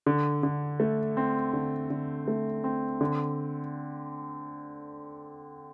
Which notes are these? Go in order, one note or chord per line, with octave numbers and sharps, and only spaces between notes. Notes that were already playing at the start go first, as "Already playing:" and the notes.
D3
D3
A3
C4
D3
D3
A3
C4
D3